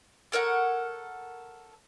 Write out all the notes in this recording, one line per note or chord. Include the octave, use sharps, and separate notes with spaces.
A4 A#4 C#5 F#5